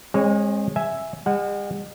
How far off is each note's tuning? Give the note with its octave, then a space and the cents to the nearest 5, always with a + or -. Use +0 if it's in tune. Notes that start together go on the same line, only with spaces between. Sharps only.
G#3 -15 C4 +45 C#5 +20
E5 +0 G#5 +0
G#3 -45 F#5 +5